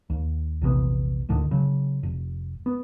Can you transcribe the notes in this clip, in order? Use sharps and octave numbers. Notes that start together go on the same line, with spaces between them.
D#2
A#1 E2 C3 B3
D2 A2 D3 D#3
C#3 F#3
F1
B3